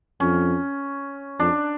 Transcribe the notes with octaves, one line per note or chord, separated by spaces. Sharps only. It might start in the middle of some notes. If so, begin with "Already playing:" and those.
F2 C#4
F2 D4